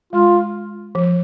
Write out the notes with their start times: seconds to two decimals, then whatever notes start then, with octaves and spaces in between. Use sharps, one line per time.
0.13 G#3 F4
0.95 F3